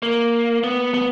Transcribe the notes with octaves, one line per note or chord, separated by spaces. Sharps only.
A#3
B3
B3